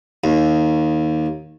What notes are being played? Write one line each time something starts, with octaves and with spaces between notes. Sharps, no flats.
D#2